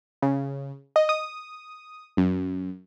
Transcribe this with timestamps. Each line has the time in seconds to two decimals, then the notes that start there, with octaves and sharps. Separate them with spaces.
0.22 C#3
0.96 D#5
1.09 D#6
2.17 F#2